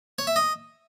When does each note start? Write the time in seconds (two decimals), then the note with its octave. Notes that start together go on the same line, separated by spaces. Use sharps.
0.18 C#5
0.27 E5
0.36 D#5